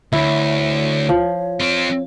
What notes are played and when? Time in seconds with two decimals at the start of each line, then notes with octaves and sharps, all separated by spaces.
0.12 D2 E4 C#5
1.09 F3
1.60 C4 F4